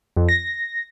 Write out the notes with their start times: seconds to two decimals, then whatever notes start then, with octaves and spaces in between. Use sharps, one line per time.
0.17 F2
0.29 A#6